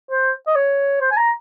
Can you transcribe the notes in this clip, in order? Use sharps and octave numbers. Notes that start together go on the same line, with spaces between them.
C5
D#5
C#5
C5
G#5
A#5